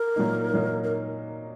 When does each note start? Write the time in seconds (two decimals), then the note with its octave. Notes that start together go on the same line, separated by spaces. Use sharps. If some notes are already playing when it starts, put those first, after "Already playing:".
Already playing: A#4
0.16 A#2 F#3 A#3 D#4
0.53 A#2 F#3 A#3 D#4
0.84 A#4